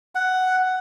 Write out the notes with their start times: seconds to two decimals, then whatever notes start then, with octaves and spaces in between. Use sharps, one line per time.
0.15 F#5